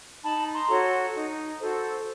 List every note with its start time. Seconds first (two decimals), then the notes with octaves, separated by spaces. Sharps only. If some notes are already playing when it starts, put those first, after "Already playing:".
0.23 D#4 A5 B5
0.54 A#5 C6
0.69 F#4 A4 C#5
1.14 D#4
1.59 F#4 A4 C5